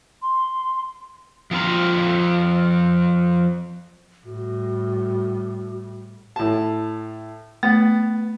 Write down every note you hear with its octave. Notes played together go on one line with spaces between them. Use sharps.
C6
F3 C4 F4 A#5
A2 G3 F#4
A2 A5
A3 B3